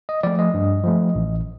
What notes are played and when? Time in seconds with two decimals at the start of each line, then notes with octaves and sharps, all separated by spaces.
0.09 D#5
0.23 F3 A3 D5
0.39 D#5
0.54 G2
0.84 F3 A3
1.15 A1